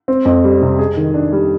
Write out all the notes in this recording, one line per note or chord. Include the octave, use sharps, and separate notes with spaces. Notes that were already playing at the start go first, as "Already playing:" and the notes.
C4
F2
G3
C3
G#4
D#3
D4
G3